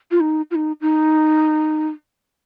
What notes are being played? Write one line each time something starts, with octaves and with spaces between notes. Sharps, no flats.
F4
D#4
F4
D#4
D#4